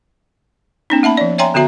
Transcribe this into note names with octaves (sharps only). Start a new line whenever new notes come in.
B3 C#4 D#4
A#3 E5 A5 B5
F3 D5
C#5 E5 G5 G#5 A#5 C6
D3 B3 F#4 E5 A#5